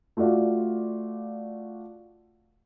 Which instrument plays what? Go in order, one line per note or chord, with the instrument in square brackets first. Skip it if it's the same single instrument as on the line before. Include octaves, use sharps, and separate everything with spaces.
[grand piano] A3 F4 F#4 D5 F5